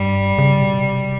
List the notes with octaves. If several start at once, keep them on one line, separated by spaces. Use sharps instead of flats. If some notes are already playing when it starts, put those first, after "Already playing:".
Already playing: G2 G3
C#3
B2
C3